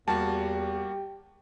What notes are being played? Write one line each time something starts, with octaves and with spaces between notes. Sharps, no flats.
E2 G3 A#3 F#4 G4 A5